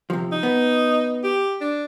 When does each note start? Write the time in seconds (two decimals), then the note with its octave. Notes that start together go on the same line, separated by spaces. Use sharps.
0.10 C3 F3
0.32 D#4
0.43 B3
1.24 G4
1.61 D4